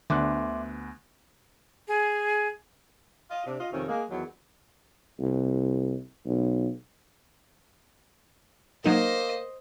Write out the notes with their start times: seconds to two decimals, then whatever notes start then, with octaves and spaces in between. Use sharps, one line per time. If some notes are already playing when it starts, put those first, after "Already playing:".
0.10 D2 D3 B3 E5 C6 D6 F#6
1.88 G#4
3.31 F4 D#5
3.46 C3 D4
3.59 F4 D#5
3.72 F2 C3 D#3 C#4 C#5
3.88 G#3 A#3
4.09 E2 D#3 F#3
5.20 C2
6.26 B1
8.84 F#3 A#3 D#4 C5 D#5 E7